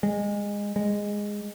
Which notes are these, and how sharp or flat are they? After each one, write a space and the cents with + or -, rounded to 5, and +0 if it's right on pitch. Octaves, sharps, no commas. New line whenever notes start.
G#3 -20
G#3 -10